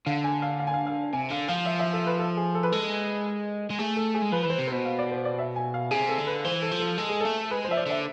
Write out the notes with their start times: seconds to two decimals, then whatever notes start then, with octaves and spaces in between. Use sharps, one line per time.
0.06 D3 F5
0.24 G#5
0.42 F5
0.60 F5
0.67 G#5
0.74 F5
0.87 F5
1.13 C3 G#5
1.30 D3 F5
1.48 F3 F5
1.65 E5
1.79 E5
1.93 A4
2.06 B4
2.19 A4
2.37 G#4
2.55 A4
2.63 B4
2.72 G#3 A4
3.70 G#3
3.79 A3 G#4
3.96 A4
4.15 G#4
4.22 G#3
4.32 F3 B4
4.43 B4
4.46 E3 C5
4.59 C3
4.68 C5
4.72 B2
4.85 F5
4.99 D5
5.11 C5
5.25 D5
5.39 E5
5.56 G#5
5.74 F5
5.91 C3 G#4
6.09 A4
6.18 D3
6.27 B4
6.44 E3 C5
6.62 A4
6.72 F3
6.80 A4
6.98 G#3 A4
7.09 G#4
7.21 A4
7.25 A3
7.51 G#3 B4
7.64 C5
7.69 F3 E5
7.77 D5
7.86 D3 E5